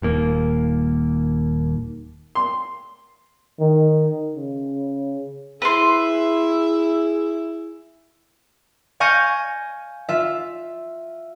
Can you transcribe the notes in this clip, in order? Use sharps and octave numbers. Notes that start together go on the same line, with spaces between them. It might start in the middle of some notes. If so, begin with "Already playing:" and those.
D#1 D#2 A#3
C6
D#3
C#3
E4 G#4 B4 E5 C6
F5 G#5 C#6 G6 A#6 D#7
F4 E5